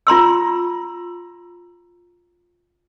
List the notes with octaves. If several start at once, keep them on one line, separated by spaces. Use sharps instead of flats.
F4 A#5 C6 E6